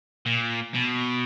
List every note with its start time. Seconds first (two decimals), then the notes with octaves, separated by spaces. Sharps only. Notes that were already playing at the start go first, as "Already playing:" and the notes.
0.26 A#2
0.74 B2